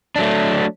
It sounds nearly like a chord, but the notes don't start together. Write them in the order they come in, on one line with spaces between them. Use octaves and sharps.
D4 F#3 A3